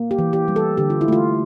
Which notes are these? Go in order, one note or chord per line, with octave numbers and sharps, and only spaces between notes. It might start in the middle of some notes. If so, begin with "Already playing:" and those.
Already playing: A#3
G4
E3
G4
G3
A4
D3 G4
F4
E4
A3 F4